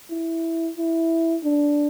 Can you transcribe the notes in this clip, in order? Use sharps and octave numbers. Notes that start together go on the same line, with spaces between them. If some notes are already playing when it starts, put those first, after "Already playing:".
E4
E4
D4